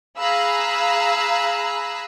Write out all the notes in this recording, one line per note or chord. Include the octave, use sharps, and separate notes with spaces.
G#4 F5 A#5 B5 E6 F#6